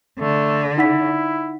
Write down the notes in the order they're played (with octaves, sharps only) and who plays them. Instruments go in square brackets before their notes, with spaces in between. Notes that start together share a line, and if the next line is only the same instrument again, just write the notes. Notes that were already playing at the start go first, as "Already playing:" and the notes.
[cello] D3 [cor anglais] A3
[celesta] D#4 F#5 B6 [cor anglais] E4